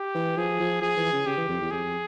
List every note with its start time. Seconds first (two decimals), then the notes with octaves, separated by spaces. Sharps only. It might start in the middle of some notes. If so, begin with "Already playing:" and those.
Already playing: G4
0.15 E3
0.37 F3 G#4
0.60 F3
0.82 F3 G#4
0.97 E3
1.12 C#3
1.27 C#3 G4
1.37 E3
1.49 F2
1.61 E2
1.71 F2 G#4